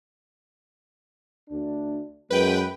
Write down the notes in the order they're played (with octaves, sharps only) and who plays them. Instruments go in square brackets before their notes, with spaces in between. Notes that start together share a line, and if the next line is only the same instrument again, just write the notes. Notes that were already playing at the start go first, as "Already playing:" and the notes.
[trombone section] D2 D4
[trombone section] F#2 G#3 [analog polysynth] B4 G5